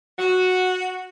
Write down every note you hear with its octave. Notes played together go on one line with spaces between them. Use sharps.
F#4